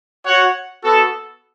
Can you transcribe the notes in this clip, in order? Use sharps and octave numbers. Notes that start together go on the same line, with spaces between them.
F#4 C#5 F#5
B3 F#4 A4